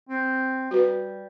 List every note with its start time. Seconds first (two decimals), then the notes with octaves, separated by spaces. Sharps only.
0.09 C4
0.71 G3 F#4 B4